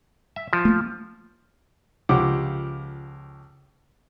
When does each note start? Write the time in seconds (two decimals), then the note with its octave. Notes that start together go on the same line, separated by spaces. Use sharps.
0.36 E5
0.53 F3
0.65 A3 A#3
2.09 C#2 F3 G4 F#5 D6